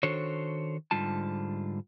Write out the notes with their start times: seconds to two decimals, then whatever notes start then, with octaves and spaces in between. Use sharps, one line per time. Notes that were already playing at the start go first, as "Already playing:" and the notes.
0.03 D#3 D4 F#4 A4 C5 C#5
0.91 G#2 D3 G3 F4 A5